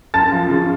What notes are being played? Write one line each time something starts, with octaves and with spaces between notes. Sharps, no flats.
F#2 A5 A6
F3
C#3